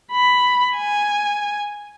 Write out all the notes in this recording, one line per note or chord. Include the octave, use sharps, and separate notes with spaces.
B5
G#5